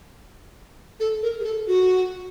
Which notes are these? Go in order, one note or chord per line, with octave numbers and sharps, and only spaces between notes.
A4
A#4
G#4
A4
F#4